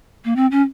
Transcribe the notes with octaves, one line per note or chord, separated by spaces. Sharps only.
A#3
C4
C#4